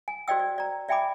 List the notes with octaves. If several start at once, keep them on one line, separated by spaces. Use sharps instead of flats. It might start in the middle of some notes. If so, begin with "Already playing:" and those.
G#5
F#4 C5 D5 D#5 G5 E6
D5
D5 A#5
D5 E5 G5 G#5 B5 D6